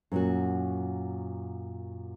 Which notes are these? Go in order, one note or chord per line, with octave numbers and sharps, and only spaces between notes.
F#2 A#2 F#4